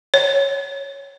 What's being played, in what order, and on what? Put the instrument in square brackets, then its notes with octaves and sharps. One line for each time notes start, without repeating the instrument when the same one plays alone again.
[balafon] C#5